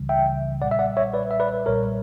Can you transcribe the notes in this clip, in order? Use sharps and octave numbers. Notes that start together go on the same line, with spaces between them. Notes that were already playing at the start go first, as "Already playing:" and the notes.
Already playing: C#2 C#3 E3 G3
E5 G5
B1 A#2 G3 D5 F#5
E5
D5 F#5
C#5 E5
B4 D5
E5
B4 D5
B1 A#2 G3 A#4 C#5